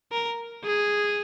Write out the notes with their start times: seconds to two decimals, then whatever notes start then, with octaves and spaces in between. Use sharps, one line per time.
0.12 A#4
0.64 G#4